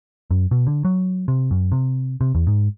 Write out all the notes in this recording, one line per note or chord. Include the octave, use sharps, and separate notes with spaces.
F#2
B2
D3
F#3
C3
F#2
C3
C3
E2
G#2